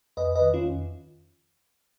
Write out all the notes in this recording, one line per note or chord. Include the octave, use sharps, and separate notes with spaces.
F2 B4 D#5
B4 D#5
D#3
C#4 F4
F2